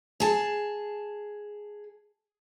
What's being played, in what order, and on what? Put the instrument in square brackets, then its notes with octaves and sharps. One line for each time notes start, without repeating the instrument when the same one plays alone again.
[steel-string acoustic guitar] G#4 A5